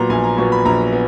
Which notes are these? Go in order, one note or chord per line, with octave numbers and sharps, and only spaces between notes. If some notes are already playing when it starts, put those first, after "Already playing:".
Already playing: A#2 F#3 B3 A#5
A#1 G#5
A#5
A#2 F#3 B3 C#6
B5
A#1 A#5
B3